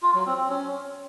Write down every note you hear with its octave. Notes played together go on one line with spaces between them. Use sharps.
F4
F#3
C4
C4
C#4